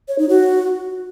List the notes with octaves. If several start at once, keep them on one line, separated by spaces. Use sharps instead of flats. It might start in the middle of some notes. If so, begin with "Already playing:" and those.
C#5
D#4
F#4